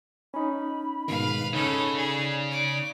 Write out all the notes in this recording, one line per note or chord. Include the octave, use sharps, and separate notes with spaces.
C#4 D#4 B5
G#2 B2 D#3 B4 F5
C#3 C#4 D#4 A4 B5
G#4 D5
D6